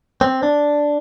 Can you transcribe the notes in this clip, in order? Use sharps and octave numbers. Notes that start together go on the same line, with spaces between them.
C4
D4